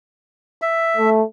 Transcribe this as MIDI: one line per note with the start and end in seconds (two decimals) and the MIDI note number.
0.62 1.10 76
0.97 1.23 57